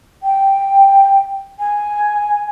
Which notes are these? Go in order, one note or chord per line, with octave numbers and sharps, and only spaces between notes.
G5
G#5